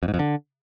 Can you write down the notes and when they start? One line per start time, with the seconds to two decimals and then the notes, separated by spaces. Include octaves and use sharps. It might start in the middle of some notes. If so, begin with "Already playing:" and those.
0.03 F2
0.08 G#2
0.14 F2
0.19 D3